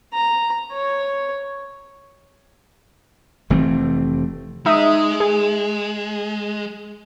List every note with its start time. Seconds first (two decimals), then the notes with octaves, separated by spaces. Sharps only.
0.14 A#5
0.73 C#5
3.50 F1 E3 A3 C4
4.66 G#3 D#4 E5 D#6
5.20 G#4